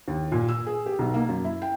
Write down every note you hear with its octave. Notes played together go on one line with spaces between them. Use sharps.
D#2
A#2
E6
G#4
G4
B1
A#3
F#2
E4
G5